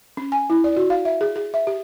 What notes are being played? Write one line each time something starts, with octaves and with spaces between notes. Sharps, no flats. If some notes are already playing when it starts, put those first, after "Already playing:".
C#4
G#5
E4
D5
F#4
F5
E5
G#4
G#4
E5
G4